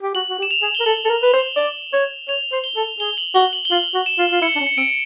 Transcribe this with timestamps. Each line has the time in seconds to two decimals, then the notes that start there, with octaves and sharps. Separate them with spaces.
0.03 G4
0.15 F#4 F#7
0.30 F#4
0.39 G4
0.42 E7
0.51 F7
0.62 G#4
0.75 G7
0.80 A#4
0.86 A4 F#7
1.05 A4
1.09 A#4
1.22 B4
1.34 C5
1.57 D5
1.93 C#5
2.28 C#5 F7
2.52 C5
2.64 G7
2.76 A4
3.00 G#4 G7
3.18 F#7
3.35 F#4 G7
3.53 F#7
3.65 G7
3.71 F4 F#7
3.94 F#4
4.06 E7
4.18 F4
4.31 F4
4.42 E4 C#7
4.56 D4
4.60 C#4
4.67 C#7
4.77 C4 D7